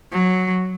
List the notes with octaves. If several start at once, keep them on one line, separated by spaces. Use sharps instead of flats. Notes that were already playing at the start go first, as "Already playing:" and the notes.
F#3